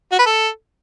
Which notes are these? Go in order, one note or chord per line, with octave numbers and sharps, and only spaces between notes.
F#4
B4
A4